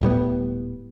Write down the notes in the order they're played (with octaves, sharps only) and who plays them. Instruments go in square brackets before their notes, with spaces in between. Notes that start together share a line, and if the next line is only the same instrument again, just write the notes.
[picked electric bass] D#1 A2 G3 B3